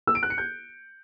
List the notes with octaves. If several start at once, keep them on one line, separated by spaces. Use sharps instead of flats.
E6
D7
F#6
C#7
G6